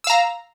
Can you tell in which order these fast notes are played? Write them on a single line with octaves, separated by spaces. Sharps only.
E6 F5 A#5